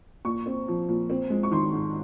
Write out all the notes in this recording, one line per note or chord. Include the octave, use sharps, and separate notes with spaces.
A#2 C#6
C4
F3
A#2
C4
G#3
C#6
D#3 C6
G#2